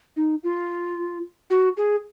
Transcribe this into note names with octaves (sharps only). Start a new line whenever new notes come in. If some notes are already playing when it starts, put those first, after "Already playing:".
D#4
F4
F#4
G#4